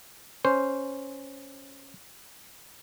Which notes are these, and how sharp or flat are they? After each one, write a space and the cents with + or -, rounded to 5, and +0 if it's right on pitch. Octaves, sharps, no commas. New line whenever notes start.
C#4 +0 C5 +0